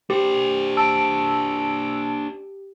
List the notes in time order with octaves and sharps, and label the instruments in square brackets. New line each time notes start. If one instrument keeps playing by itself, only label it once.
[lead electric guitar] D4 C5 [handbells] G4
[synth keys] A5 E6 D7